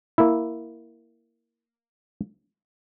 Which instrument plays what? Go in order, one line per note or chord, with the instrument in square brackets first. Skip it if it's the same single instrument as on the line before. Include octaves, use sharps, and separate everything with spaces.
[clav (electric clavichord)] A#3 E4